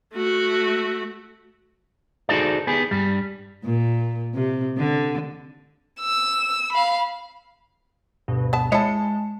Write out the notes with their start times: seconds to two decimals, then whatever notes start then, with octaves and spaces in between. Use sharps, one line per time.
0.15 A3 F#4
2.29 D#4 F#4 G#4 A4 C5 D5
2.67 B3 G4 G#4
2.91 G2 G3
3.64 A#2
4.34 C3
4.78 D3
6.00 E6
6.73 F5 B5
8.28 D2 G2 B2
8.53 B3 A5
8.72 G#3 E4 C#5 D#5 A5 C#7